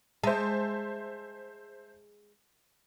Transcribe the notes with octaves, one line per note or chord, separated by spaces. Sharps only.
G#3 C5 E5 A5